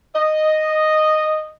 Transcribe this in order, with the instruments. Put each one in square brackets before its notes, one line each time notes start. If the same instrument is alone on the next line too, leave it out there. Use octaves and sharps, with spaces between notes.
[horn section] D#5